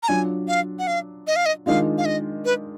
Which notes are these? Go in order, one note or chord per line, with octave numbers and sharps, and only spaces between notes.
A#5
F#3 D4 F4 G#5
F5
F#5
F5
D#5
F5
D#5
D#3 G#3 D4 F4 F5
F5
D#5
B4